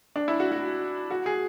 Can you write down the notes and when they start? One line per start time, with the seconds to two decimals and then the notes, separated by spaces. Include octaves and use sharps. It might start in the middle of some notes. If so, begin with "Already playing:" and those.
0.16 D4
0.28 E4
0.40 F#4
0.52 F#4
1.11 F#4
1.26 G#4